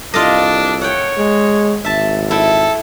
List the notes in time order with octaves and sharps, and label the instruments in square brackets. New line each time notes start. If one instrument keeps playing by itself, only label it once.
[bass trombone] C2 [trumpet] D4 [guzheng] F4 A4 D#5
[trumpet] C#5 [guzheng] F#5 G5
[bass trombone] G#3
[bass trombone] G#1 [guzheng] E5 A5
[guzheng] E4 G5 [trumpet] A4